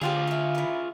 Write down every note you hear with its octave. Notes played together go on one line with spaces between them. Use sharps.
D3 F4 G4 G#4 C5 D5
E5 F5
E4 A#4